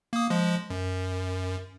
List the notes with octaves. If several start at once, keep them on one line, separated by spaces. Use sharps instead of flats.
A#3 D#6
F3 G#3
F#2